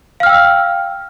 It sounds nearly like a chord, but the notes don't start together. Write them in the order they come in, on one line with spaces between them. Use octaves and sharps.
F5 F6 G5 E6